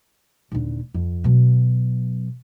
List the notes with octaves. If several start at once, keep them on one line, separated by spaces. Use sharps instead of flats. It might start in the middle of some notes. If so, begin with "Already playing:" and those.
D#1 D3
F2
B2 F#3